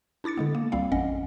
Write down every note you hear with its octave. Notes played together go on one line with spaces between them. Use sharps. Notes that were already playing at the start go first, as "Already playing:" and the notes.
D4 E4 D6 A6 C#7
D3 G#3 B3
A#3
C#2 G3 C4 F5
A1 F2 C#4 D#5 F#5